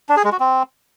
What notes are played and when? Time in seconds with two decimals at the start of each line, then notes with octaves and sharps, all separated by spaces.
0.09 D4
0.17 G#4
0.25 G#3
0.32 F#4
0.40 C4